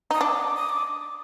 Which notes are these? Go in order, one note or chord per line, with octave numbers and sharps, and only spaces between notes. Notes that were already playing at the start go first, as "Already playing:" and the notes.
D#4 D#6
D4 D6
D#6
D6